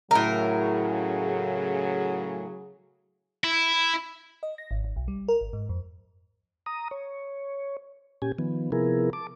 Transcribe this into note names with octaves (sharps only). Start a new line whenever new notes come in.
A2 C#3 F#3 G#4 A#4
E4
D#5
A#6
G#1
G#1
B1
G3
A#4
G#1
G#2
F2
A#5 D#6
C#5
A#2 C#4 G4 G#5
D#3 F3 B3
C3 F3 B3 E4 G#4 A#4
A5 D6